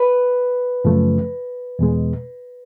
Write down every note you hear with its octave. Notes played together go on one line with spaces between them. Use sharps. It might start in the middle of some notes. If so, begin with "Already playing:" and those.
Already playing: B4
F#2 C#3 F3 A3
E2 B2 G#3